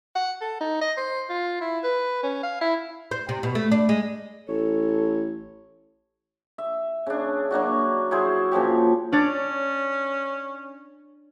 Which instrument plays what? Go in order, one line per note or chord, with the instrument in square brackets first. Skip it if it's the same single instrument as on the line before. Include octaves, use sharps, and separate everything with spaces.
[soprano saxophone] F#5
A4
D#4
D#5
C5
F4
E4
B4
C#4
F5
E4
[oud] C5
C3
B2
A3
D4
G#3
[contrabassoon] A1 [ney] A4 [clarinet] C#5
[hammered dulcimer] E5
C#3 D4
F#3 A#3 D4 F#4
F#3 E4 G#4 C5
A#2 C#3 F3 G4
[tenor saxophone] C#4 [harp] D4 C#5 D5